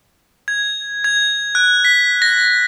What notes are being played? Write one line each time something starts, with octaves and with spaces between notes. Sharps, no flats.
G#6
G#6
F#6
B6
A#6